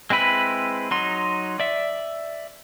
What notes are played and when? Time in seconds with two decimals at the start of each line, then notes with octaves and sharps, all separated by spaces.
0.10 G#3 C4 E4 B4 B5
0.91 F#3 D#4 C6
1.60 D5 E5